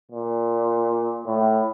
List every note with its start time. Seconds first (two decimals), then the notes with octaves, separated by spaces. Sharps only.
0.11 A#2
1.26 A2